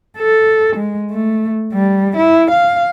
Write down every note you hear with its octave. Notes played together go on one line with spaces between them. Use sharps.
A4
G#3
A3
G3
E4
F5